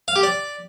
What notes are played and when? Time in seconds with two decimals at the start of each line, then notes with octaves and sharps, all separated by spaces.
0.08 F5
0.16 G4
0.23 D5